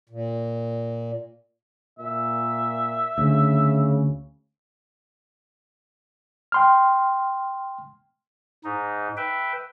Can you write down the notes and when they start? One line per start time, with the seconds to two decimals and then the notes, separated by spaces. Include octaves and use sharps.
0.09 A#2
1.99 A#2 E5
3.18 D2 C#3
6.52 G5 C6 F6
8.64 G#2 D#4
9.17 B4 E5 G5